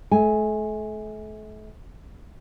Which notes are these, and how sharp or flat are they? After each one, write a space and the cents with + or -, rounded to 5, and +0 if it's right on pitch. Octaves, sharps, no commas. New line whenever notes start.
A3 -40 G#5 +0